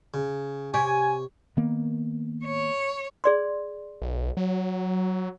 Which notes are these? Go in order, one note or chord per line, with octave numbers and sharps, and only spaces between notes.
C#3
C3 G4 C#5 D5 G#5
D#3 A#3 B3
C#5
G#4 D5 C6
B1
F#3